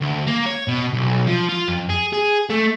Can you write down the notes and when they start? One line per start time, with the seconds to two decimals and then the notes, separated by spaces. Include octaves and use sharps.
0.01 D2
0.27 A#3
0.46 C#5
0.68 B2
0.93 B1
1.27 F3
1.49 F4
1.68 F2
1.89 G#4
2.13 G#4
2.50 A3